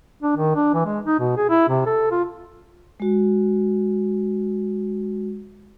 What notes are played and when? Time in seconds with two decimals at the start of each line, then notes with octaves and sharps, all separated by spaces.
0.22 D4
0.37 D#3
0.55 D4
0.74 E3
0.86 G#3
1.05 D#4
1.19 B2
1.37 G#4
1.50 E4
1.69 C3
1.86 A4
2.11 F4
3.00 G#3 F#4